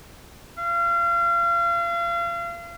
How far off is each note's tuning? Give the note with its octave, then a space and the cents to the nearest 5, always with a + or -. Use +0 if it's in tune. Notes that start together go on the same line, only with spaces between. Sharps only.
F5 -35